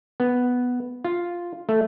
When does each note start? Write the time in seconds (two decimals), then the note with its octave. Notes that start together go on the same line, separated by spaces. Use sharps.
0.20 B3
1.05 F4
1.69 A3